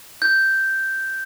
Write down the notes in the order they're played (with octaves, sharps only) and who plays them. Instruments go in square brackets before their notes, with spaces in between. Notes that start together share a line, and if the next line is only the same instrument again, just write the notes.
[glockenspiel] G6